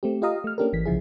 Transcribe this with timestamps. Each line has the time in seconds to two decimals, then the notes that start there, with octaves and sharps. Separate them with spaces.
0.03 A3 C4 G4
0.22 F4 G4 D#5 F5 A#5 D#6
0.44 A3 F6
0.58 A#3 C#4 D4 G4 A4 A#4
0.73 G#1 E3 B6
0.86 B1 C#3 F3 E4 G#4